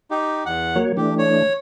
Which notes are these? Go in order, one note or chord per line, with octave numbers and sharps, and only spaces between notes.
D#4 G4
E2 F#5
F#3 A#3 C#5
E3 A3 D4 G4
C#5